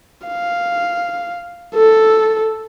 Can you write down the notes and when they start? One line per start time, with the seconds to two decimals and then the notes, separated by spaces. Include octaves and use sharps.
0.27 F5
1.75 A4